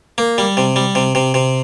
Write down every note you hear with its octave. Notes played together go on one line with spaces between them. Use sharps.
A#3
G3
C3
G3
C3
C3
C3